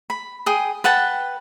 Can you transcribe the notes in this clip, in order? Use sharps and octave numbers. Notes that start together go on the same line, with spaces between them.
B5
G#4 G5 D#6
B4 F#5 G5 A5